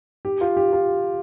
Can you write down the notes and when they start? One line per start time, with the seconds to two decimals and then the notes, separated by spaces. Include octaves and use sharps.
0.25 G4
0.41 F4
0.57 G4
0.73 F4